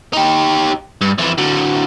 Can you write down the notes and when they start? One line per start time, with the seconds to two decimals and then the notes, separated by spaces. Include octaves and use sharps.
0.13 D#4 G4
1.01 G2
1.18 F2 E3
1.38 D3 F#3